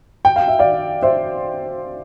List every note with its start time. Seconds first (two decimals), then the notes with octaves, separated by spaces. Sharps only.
0.25 G5
0.36 F5
0.48 E5
0.59 D5 F5
1.03 C5 E5